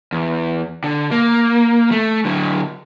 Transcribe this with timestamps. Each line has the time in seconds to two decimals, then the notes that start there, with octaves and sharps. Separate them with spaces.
0.12 E2
0.84 D3
1.11 A#3
1.91 A3
2.25 D3 F#3